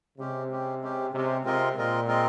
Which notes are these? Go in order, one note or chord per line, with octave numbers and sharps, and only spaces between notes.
C3 G#3 C#4 G4
G#3 C#4 G4
G#3 C#4 G4
C3 G#3 C#4 G4
C3 G#3 C4 F4 A#4 D#5
A#2 G#3 C4 F4 A#4 D#5
G#3 C4 F4 A#4 D#5